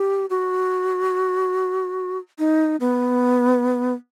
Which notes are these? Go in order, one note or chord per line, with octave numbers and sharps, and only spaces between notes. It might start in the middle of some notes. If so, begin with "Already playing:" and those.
Already playing: G4
F#4
D#4
B3